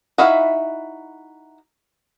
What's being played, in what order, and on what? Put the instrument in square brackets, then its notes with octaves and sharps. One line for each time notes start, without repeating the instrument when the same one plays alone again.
[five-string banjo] D#4 E4 F#4 E5 F5